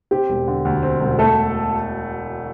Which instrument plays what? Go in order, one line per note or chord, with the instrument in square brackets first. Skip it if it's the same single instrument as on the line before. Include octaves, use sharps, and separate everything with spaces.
[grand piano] C4 [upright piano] G4
[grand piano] E1
D3
D2
C4
E1
[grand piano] A3 [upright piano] A4